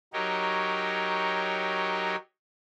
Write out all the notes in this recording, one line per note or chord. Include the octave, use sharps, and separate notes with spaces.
F#3 D#4 G4 A#4 C#5